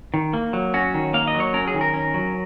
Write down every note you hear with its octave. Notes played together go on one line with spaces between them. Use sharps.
D#3
A#3
F#3
C#4 F#4
D#3
A#3 F5
D#5
F#3
C#5
C#4 A#4
G#4
D#3
A#4
C#4
F#3